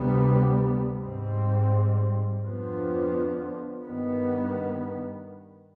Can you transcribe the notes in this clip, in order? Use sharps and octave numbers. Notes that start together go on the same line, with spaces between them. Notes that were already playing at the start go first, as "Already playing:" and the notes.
Already playing: D2 C3 G3 B3
G#2 G3 C4
F2 D3 F3 B3
G2 D#3 B3